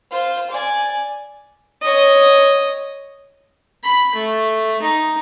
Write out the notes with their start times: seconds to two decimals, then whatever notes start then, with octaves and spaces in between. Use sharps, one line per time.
0.11 F4 C5
0.51 D5 G#5
1.82 C#5 D#5
3.83 B5
4.15 A3
4.81 D#4